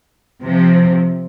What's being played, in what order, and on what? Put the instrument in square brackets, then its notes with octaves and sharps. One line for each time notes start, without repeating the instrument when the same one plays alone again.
[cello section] C3 F3